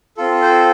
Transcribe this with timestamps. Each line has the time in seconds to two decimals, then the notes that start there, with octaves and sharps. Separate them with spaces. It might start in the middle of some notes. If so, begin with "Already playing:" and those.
0.17 C4 F4 A4
0.42 C5